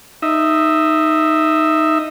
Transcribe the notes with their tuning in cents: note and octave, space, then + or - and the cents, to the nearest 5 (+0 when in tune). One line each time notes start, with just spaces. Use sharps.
D#4 +0 E5 +0